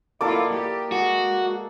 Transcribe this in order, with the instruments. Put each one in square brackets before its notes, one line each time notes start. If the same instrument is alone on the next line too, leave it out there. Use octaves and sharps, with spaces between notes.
[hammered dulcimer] A#3 D5 D#5 [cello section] E4 F4 [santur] A4 D6
[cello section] G4
[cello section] G#3 [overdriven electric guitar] F#4 [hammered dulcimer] G#4